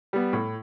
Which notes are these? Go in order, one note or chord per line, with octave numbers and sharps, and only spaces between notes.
G3 B3
A2